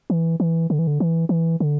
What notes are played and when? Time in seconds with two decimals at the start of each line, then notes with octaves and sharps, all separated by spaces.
0.10 E3
0.40 E3
0.70 D3
0.79 E3
0.87 D3
1.00 E3
1.29 E3
1.60 D3